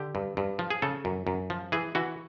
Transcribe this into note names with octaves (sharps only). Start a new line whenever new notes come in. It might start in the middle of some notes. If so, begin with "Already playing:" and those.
Already playing: D3 G4
G2
G2
F3
G#4
C#3 A4
F#2
F#2
F3
E3 G#4
E3 F#4